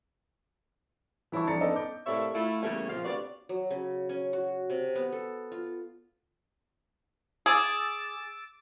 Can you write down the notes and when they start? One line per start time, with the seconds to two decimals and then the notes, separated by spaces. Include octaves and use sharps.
1.32 E3 E4 C#5 A5 C#6
1.47 F2 D4 A#5 A6 C#7
1.61 B3 C#4 D#4 A4 D5 D#5
1.76 D6 G6
2.06 A2 C3 A#3 C#5 D5 E5
2.34 A3 E4 F4
2.63 E2 C#3 G3 A3 A#3 C#4
2.89 F2 A#2 F3 F4 F5
3.05 D2 C3 B3 C#5 D5
3.49 F#3
3.70 C#3
4.09 C#4
4.33 F#4
4.70 C3
4.95 B3
5.12 A4
5.52 F4
7.46 G#4 D6 E6 A6